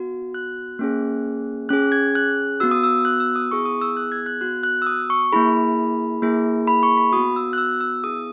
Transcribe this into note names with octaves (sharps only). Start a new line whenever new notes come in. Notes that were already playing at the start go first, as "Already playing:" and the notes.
Already playing: B3 F#4
F#6
A#3 C#4 G#4
C#4 G#4 F#6
G#6
F#6
B3 F#4 E6
D#6
E6
F#6
E6
D#6
B3 E4 G#4 C#6
D#6
E6
F#6
G#6
F#6
B3 F#4 F#6
F#6
E6
D#6
C#6
A#3 E4 G#4 B5
A#3 E4 G#4
B5
C#6
B5
B3 F#4 D#6
E6
F#6
E6
E6
B3 E4 G#4 D#6